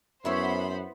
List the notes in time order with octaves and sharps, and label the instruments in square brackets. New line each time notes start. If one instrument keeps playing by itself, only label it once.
[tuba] F#2 [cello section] B3 [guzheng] E4 C#5 E5 [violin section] C5 B5